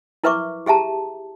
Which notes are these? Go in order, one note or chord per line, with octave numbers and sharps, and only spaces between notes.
E4 A#4 B4 E5 C#6 D6
G4 G#4 E5 A5 A#5